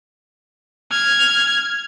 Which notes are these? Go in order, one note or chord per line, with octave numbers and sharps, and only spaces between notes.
F6 G#6